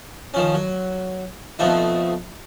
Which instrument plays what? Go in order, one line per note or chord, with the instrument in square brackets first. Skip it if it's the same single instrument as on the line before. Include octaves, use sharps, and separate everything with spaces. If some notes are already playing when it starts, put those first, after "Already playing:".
[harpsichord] D#3 F3 C#4
F#3
F2 B2 F3 A3 D#4